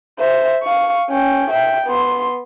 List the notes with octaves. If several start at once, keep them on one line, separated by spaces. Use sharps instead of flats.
C5 E5
F5 C#6
C#4 G5
E5 G5
B3 C6